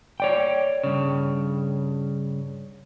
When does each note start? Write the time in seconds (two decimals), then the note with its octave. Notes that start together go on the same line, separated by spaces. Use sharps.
0.20 C#5 D5 G5
0.84 G2 C#3